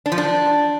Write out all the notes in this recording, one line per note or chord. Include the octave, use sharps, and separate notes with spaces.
D4
F3
D4